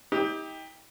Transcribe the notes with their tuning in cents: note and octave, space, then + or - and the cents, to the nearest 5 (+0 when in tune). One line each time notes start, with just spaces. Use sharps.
D#4 +40 G4 +15